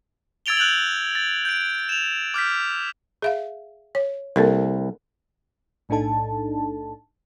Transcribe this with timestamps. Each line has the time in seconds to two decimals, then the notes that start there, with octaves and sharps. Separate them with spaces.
0.46 E6 G#6 A6 D7 F7 G7
0.57 F#6 G6 F7 F#7
1.15 A6
1.45 G6 D7
1.89 E7 F7
2.34 D6 F6 G6 B6
3.22 G#4 E5 F5
3.95 C#5
4.36 C2 A#3 A4 A#4
5.89 B1 A2 D4 D#4 A4 A5